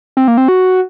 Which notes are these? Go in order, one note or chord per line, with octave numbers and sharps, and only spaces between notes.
C4
A#3
C4
F#4